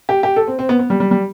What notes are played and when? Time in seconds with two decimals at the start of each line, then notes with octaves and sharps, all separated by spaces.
0.09 G4
0.23 G4
0.36 A4
0.48 C4
0.59 C4
0.69 B3
0.79 B3
0.90 G3
1.00 G3
1.11 G3